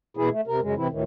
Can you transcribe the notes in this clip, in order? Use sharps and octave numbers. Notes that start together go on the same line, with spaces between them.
B2 E3 E4 G#4
A3
C3 A#4
F#2 C#3 G#3
C3 E3 C4 E4
D2 A2 D#3 E3